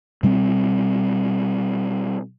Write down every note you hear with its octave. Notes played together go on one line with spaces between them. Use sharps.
B2 G3 A3 C4